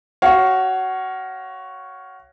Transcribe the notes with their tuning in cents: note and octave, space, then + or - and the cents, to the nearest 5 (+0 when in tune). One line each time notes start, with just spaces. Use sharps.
F#4 +20 C#5 +0 F5 +0